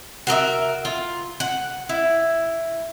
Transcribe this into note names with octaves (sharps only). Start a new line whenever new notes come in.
F#4 A#4 D#5 E5
F4
F#5
E4